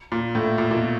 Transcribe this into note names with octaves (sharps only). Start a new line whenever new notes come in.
A#2
A2
A#2
A#2
B2